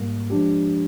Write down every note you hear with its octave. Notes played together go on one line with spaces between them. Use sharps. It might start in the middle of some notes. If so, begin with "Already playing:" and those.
Already playing: G#2 G3 A#3
F3 G#3 D4 G4